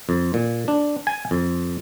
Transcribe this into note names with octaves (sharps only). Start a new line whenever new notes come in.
F2
A#2
D4
G#5
F2